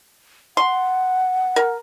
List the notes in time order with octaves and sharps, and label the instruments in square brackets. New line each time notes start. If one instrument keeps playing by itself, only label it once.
[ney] F#5 [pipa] C6
[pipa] A#4